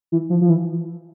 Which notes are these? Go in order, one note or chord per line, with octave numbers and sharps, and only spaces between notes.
E3
F3
F3
E3